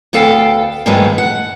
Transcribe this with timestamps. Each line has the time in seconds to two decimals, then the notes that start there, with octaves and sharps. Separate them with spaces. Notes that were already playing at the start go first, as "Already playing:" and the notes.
0.13 D2 B3 A4 F5 G5
0.86 G2 D#3 F3 G#3 A3 B3
1.18 F#5